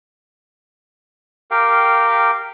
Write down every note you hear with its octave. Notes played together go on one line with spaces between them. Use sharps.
G4 A#4 F5 G5